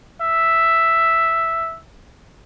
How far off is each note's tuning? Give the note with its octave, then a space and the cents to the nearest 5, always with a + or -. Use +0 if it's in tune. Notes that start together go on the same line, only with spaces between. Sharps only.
E5 +0